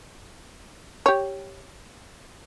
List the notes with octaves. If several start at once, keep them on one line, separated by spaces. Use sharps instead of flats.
G4 C#5